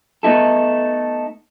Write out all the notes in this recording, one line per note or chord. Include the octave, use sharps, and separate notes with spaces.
A3 B3 D#4 E4 A4